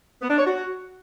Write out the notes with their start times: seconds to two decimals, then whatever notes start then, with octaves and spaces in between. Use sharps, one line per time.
0.21 B3
0.30 D4
0.38 C#5
0.46 F#4